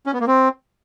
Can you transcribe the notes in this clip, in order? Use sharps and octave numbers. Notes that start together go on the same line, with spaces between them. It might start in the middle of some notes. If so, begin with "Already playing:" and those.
C#4
B3
A#3
C4